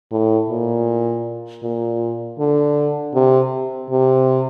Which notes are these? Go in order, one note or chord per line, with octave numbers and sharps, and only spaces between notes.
A2
A#2
A#2
D3
C3
C3